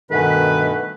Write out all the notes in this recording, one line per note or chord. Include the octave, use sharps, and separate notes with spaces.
G2 B2 D#3 A3 A4 B4 F#5 G#5